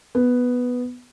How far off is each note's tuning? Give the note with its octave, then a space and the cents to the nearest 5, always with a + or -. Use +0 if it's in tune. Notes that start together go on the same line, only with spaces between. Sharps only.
B3 +0